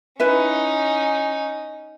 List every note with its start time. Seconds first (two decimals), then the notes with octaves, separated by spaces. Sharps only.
0.20 C#4 D#4 E4 B4 E5